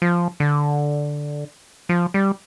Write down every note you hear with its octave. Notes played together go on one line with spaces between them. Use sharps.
F3
D3
F3
G3